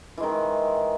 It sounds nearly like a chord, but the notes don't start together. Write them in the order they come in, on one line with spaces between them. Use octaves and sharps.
E3 G#3 D#3